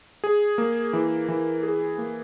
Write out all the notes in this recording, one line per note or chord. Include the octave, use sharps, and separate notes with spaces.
G#4
A#3
E3
E3
G#4
A#3